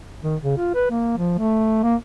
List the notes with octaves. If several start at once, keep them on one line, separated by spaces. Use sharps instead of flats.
D#3
C#3
F4
B4
A#3
F3
A3
A#3